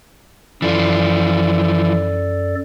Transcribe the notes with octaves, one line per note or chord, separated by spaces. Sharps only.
F#2 E3 F3 A4 D5